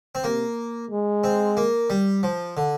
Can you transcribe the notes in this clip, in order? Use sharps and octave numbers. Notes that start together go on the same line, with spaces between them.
C4
C3 A#3
G#3
C4
A#3
G3
F3
D3